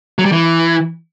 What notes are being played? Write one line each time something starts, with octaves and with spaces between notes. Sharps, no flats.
F#3
G3
E3